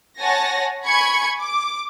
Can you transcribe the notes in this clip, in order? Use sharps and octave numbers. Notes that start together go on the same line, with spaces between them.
C#5 F#5 G#5 A5 A#6
G#5 B5 C#6 G#6 C#7
D6